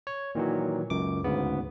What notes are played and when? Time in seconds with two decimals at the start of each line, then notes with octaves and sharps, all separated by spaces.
0.07 C#5
0.35 A#2 D#3 E3 F#3
0.90 C#2 F#2 D6
1.24 D2 G#2 C#3 B3